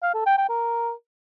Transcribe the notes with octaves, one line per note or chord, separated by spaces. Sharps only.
F5
A4
G5
G5
A#4